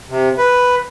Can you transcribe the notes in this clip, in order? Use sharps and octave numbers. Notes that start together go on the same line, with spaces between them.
C3
B4